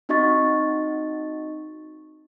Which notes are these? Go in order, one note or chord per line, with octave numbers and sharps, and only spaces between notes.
C4 D#4 F#4 D#5 C#6 A6